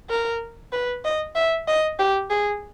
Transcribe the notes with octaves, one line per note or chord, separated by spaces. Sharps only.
A#4
B4
D#5
E5
D#5
G4
G#4